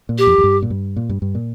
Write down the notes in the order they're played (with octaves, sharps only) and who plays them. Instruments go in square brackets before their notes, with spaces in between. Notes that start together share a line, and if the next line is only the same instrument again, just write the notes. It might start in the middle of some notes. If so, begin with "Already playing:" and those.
[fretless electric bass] A#2
[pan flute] G4
[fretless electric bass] F2
F2
G2
A#2
G2
A#2
G2
G2
A#2